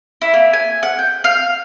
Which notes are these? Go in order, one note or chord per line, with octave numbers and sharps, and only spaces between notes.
E4
A#3
G#5
F#5
G5
F5